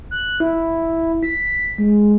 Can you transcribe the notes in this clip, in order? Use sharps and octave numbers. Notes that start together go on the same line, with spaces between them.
F#6
E4
B6
G#3